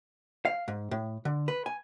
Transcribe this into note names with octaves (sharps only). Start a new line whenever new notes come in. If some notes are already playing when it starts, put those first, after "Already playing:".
F5
G#2
A2
D3
B4
G#5